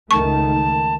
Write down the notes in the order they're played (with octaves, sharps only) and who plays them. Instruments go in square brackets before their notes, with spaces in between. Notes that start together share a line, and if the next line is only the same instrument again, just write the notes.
[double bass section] C#2 D#3 A3 [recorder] A5 [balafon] C#6